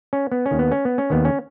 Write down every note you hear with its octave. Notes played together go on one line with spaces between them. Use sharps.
C#4
B3
C#4
D#2 D#3
B3
C#4
B3
C#4
D#2 D#3 B3
C#4